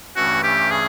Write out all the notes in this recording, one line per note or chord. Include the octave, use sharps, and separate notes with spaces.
G2 E3 A3 C#4 F#4
G4
G#4